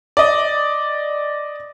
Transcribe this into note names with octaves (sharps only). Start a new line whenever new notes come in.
D5 D#5